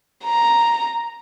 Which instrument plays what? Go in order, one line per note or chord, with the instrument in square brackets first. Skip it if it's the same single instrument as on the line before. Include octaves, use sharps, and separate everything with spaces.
[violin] A#5